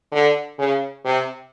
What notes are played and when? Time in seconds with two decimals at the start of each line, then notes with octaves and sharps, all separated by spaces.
0.12 D3
0.59 C#3
1.05 C3